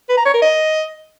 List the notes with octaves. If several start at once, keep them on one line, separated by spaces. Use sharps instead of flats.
B4
A#5
C#5
A#4
D#5